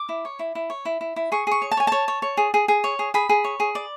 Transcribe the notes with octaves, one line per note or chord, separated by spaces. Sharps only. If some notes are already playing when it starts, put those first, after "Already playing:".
Already playing: D6
E4
C#5
E4
E4
C#5
E4
E4
E4
G#4 C#6
G#4 C#6
C#5
A5
C#5 G#5
C#5 A5
C#5
C#5
G#4
G#4
G#4
C#5
G#4
G#4 B5
G#4
C#5
G#4
D5